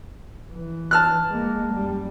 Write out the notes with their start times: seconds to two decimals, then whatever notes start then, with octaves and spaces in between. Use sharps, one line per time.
0.53 E3
0.91 A5 F6 F#6
1.31 G#3 A#3
1.73 F#2 G3